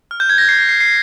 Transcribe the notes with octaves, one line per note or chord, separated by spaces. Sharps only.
F6
G6
G#6
A#6
C7
C7
C7
C7